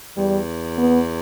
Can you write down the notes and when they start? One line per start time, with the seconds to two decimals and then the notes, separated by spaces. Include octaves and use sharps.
0.17 E2 G3
0.78 B3